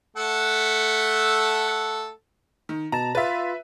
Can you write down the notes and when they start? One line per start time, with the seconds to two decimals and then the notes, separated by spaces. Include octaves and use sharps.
0.17 A3 A4 F#5
2.69 D#3
2.92 B2 A5 A#5
3.15 F4 B4 E5 A6